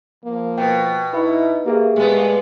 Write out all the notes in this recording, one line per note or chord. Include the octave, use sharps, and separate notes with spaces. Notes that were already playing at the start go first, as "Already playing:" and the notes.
F3 A#3
B2 G5
D#4 E4 B4 E5
A#3 G4 G#4 E5
A#2 G#3 A3 B3